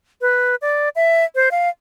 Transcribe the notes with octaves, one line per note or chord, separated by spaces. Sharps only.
B4
D5
E5
C5
F5